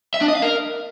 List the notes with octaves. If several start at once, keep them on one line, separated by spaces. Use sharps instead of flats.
E5
D4
D#5
F5
A#4